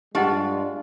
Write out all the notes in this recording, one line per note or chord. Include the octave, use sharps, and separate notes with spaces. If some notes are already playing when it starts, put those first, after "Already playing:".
G2 G#3 D4 F4 G4 D#5 F#5